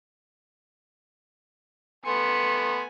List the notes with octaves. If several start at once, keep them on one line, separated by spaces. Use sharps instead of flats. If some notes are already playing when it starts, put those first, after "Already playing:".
A3 B3 G#5 C6 C#7